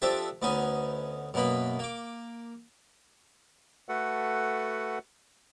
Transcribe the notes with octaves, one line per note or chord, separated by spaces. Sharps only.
F3 C4 D4 G4 A4 E5
D2 B3 C#4 D#4 G#5
F#2 B2 A#3 B3 B5
A#3 D6
A3 F#4 A4 B4 F#5